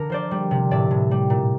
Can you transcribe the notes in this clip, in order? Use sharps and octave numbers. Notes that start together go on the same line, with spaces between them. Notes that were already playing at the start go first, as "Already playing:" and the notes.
Already playing: D3 A#4
F3 C5 D5
G3
C3
A2 D5 E5
A2
G3
A#2